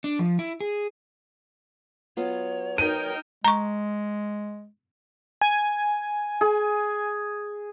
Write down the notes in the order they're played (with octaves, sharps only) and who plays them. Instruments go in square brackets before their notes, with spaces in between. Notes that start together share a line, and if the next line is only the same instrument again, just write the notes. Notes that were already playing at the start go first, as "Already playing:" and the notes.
[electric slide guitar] D4
F3
E4
G#4
[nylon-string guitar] F#3 B3 F4 [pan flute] C#5
[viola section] D#4 A#4 G5 [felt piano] D#7
[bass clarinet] G#3 [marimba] A#5 C#6
[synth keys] G#5
[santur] G#4